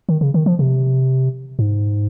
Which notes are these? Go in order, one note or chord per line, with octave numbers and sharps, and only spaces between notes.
D#3
C#3
D#3
F3
C3
G#2